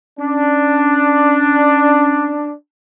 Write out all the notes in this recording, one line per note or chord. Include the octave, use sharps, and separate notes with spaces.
C#4 D4